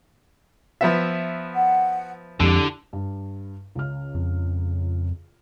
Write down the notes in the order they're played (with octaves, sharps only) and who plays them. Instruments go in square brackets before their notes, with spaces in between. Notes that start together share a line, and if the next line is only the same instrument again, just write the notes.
[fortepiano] F3 B3 E5
[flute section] F#5
[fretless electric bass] F2 G#3 [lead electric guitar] D3 [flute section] E4 G4
[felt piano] G2
C#2 C#3 F6
[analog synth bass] F2